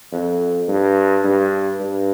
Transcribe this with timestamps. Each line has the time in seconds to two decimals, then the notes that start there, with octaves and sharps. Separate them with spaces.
0.12 F2
0.68 G2
1.24 G2
1.80 G2